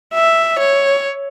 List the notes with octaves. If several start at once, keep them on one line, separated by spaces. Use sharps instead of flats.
E5
C#5